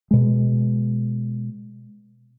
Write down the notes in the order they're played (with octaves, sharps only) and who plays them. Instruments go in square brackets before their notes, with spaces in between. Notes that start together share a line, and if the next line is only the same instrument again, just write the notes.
[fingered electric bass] B2 G#3